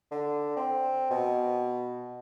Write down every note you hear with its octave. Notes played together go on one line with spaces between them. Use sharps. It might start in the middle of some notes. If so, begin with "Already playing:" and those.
D3
C4
B2